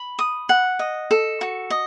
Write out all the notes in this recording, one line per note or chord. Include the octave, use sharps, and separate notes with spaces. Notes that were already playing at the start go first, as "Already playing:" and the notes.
Already playing: B5
D#6
F#5
D#5
A4
F#4
D#5